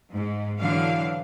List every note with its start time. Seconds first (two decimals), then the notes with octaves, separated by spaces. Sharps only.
0.12 G#2
0.58 D3 E3 F#3 D4 F5